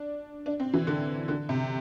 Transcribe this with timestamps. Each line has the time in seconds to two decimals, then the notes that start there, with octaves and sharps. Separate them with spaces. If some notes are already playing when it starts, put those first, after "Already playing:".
Already playing: D4
0.46 D4
0.60 C4
0.73 E3
0.87 D3
1.28 D3
1.49 C3